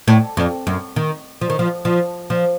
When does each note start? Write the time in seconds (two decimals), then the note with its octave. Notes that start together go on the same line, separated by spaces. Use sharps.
0.08 A2
0.37 F2
0.67 F#2
0.96 D#3
1.41 F3
1.50 D#3
1.59 F3
1.85 F3
2.30 F3